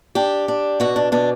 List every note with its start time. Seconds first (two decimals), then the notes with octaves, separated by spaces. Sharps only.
0.15 D4 G4
0.48 D4
0.80 B2 F#4
0.96 D4
1.12 B2 D4